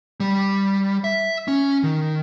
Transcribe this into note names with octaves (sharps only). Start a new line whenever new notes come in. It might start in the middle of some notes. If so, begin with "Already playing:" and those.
G3
E5
C#4
D#3